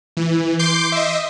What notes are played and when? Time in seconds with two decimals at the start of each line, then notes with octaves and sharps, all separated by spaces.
0.17 E3
0.59 C6 D6 G6 C7
0.92 D#5 E5